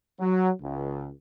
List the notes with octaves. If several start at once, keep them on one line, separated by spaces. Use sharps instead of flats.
F#3
C#2